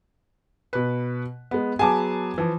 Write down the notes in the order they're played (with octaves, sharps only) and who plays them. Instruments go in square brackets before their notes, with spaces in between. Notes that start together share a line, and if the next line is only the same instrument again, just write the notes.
[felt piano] B2 B4
G#3 B3
[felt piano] F#3 B3 G#4 [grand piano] G#5 A5 D6
[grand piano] E3 F3